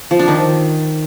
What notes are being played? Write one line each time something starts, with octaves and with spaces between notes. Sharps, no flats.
F3
D4
D#3